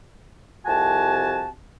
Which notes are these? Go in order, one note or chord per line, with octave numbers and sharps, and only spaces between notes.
C2 F2 C3 F#4 G#5 A5